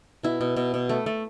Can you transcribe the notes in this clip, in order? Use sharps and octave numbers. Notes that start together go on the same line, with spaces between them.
B2 E4
B2
B2
B2
A3
A3